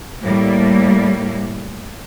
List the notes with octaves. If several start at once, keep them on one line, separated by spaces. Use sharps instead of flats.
A2 G3 A#3